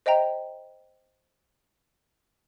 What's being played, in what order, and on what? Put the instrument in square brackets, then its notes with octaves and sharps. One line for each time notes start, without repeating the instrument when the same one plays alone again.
[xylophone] C5 D#5 E5 G5 A#5